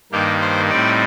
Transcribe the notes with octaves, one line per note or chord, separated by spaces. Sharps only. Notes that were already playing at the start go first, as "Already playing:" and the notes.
G2 D#3 A#3 G4
C5
A2 G3 C4 D#4 D5